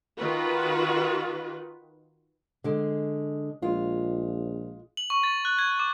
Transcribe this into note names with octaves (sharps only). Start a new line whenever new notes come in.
D#3 F4 F#4 B4
D3 G#3
A#1 G#3 F4
F#7
C#6
A6
F#6
G#6
D6